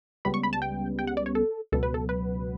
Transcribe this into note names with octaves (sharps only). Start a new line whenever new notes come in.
C#2 C#3 G3 B3 B5
C#6
B5
A5
G5
G5
F#5
D5
C#5
A4
C#2 B2 F#3 B3 A4
B4
A4
B4